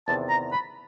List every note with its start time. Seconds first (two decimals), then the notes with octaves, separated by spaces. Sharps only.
0.08 E2 C3 D#3 A5
0.30 A#5
0.52 B5